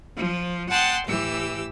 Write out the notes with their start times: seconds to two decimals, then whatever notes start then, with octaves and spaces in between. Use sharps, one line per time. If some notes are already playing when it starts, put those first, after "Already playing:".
0.16 F3
0.69 F#5 G5 A5 C6 D#6 F#6
1.06 A2 E3 G4 E6